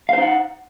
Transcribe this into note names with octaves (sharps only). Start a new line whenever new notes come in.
D#4 C5 F5 F#5